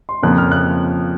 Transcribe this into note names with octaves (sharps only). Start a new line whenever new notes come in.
C6
F2 C#3 F3 A#3 F#6
F6
F#6